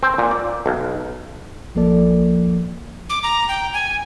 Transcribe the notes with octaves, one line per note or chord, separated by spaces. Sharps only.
C4
A#2
D5
B1
A#1 F3 A#3 A4 D5
D6
A#5
G5
G#5